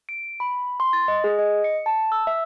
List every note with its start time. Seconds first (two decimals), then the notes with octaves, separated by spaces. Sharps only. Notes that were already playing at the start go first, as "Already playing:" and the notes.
0.09 D7
0.40 B5
0.80 C6
0.93 A6
1.08 D#5
1.24 G#4
1.39 D#5
1.64 C#7
1.86 A5
2.12 E6
2.27 E5